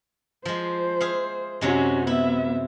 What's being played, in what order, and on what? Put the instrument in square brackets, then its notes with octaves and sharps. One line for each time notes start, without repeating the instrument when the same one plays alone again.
[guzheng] F3 G#3 [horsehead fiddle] C5
[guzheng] G#4 E5 F5
[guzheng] F#2 C3 G#3 [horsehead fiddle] C#4 F#4
[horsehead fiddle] B3 E5 [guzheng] E4